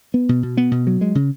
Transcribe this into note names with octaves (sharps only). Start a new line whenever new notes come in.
B3
B2
B2
B3
B2
F#3
G#3
C#3